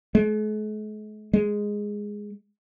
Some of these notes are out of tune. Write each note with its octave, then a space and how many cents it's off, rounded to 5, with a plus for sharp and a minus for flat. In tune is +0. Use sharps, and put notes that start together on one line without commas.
G#3 +45
G#3 -5